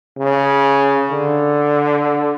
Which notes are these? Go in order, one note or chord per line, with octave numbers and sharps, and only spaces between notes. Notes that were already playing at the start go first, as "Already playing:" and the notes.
C#3
D3